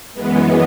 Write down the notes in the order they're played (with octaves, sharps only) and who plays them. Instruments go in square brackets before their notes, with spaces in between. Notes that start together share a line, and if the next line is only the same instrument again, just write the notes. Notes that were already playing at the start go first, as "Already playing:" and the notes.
[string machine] F#2 E3 G#3 B3